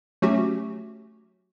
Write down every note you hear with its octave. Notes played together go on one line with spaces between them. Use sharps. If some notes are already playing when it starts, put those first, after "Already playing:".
F#3 A3 C#4 F#4 G4